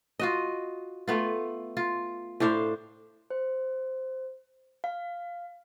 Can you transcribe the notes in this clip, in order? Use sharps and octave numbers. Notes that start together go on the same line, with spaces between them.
F4 F#4 D#5
A3 B3 F4
F4
A2 D4 C5 F5
C5
F5